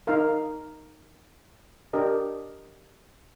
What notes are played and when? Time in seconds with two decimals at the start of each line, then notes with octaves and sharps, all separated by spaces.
0.07 D#4 A#4 F5
1.93 D4 G4 A#4 D#5